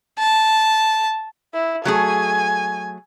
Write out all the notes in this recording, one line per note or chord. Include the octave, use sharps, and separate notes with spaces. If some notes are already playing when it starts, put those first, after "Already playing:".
A5
E4
F#3 A3 G#4 G#5